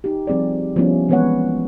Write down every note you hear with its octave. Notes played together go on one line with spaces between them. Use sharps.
D#4 G4
F3 G3 C4 G#4 D5
F3 G3 B3 C#4 E4
E3 G#3 B3 B4 C#5 F#5